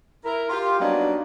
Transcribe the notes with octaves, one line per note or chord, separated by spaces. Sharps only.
E4 A#4
F4 G4
F#3 G3 A#3 B3 D4 D#4